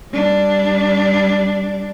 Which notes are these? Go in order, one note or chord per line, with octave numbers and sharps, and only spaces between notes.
G3 D4